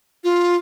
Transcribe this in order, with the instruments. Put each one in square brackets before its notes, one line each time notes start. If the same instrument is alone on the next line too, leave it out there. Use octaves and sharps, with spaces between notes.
[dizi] F4